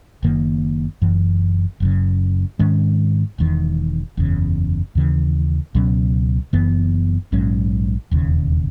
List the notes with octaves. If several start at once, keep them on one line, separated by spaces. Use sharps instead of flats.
F#1 F#2 D#3 A#3
F#1 F#2 E3
F#1 F#2 C#3
G#2 D#3 G#3 C#4
E1 E2 D#3
F#1 E2 C#3
D#2 C#3 E3
C#2 B2 F#3 C#4
F#1 F#2 E3 B3
A#1 G#2 F#3 C#4
E1 D#2 C#3